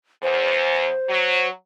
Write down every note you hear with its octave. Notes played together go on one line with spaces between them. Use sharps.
E2 C5
F#3